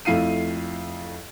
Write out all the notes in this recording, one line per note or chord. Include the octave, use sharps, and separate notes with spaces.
F2 A3 E4 F5 C7 D#7